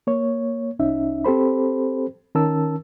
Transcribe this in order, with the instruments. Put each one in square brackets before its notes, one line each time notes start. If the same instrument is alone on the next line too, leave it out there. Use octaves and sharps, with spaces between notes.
[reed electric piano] A#3 C#5
C2 C#4 D#4 E5
C4 G4 A4 C5 B5
D#3 C#4 A#4 A5 E6